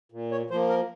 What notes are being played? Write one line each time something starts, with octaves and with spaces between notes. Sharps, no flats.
A#2
C#5
F3 A#3 C5
A#4